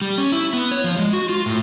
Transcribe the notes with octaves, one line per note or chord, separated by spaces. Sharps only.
G3
C#4
E4
B3
C#5
F3
G#3
F#4
F4
A2